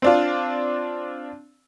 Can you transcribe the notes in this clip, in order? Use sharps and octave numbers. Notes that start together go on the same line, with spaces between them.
C4 D4 F4